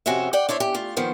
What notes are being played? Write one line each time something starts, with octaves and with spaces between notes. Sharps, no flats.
F2 C3 C#4 F#4 C5 E5
D5 F#5 G5
D4 E4 C5 C#5
G4
A3 F4
D#3 F3 B3 C5